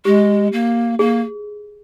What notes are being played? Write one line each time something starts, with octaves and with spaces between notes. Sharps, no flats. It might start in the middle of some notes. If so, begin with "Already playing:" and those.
G#3 G4
A#3
A#3 G#4